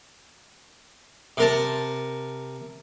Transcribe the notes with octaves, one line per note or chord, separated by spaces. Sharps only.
C3 A#4 A5